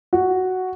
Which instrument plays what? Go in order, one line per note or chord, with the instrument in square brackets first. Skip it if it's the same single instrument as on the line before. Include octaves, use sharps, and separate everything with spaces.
[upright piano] F#4